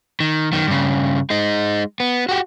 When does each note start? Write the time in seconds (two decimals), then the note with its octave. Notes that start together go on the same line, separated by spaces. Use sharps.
0.20 D#3
0.52 F#2 D#3
0.67 G2 C#3
1.30 G#3 D#4
2.00 B3
2.29 F#4 G4